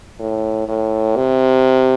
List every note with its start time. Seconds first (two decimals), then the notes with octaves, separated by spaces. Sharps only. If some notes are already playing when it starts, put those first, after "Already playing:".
0.20 A2
0.68 A2
1.17 C3